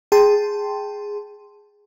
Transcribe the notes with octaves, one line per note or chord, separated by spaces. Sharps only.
G#4 G5 A5 C6